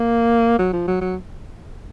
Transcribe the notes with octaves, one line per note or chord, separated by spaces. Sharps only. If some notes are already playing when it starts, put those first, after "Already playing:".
Already playing: A#3
F#3
F3
F#3
F#3